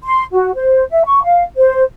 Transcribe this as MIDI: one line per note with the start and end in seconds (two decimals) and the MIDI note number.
0.03 0.24 84
0.32 0.50 66
0.55 0.85 72
0.91 1.03 76
1.05 1.22 85
1.23 1.44 77
1.56 1.82 72